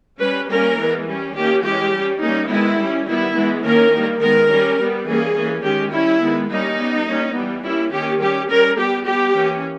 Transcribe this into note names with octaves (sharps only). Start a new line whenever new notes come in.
G3 C#4 B4
G3 A#3 C#4 A#4
E3 G#3 B3
G3 C#4
D#3 A#3 C#4 G4
E3 G#3 C#4 G4
G3 C#4
G3 A#3 C#4 D#4
D#3 G#3 B3 E4
G3 C#4
D#3 G3 B3 E4
E3 G#3 B3
D#3 A#3 C#4 A#4
D#3 G3 A#3
D#3 G#3 B3 A#4
G3 C#4
G3 B3
E3 G3 A#3 C#4 G#4
E3 A#3 C#4
D#3 G#3 C#4 G4
G3 C#4 E4
D#3 G#3 B3
G3 A#3 C#4 D#4
G3 B3
G3 A#3 C#4
E3 G3 B3
G3 A#3 C#4 E4
D#3 A#3 C#4 G4
G3 C#4 G4
G3 C#4 A#4
G3 B3 G4
G3 B3 G4
E3 A#3 C#4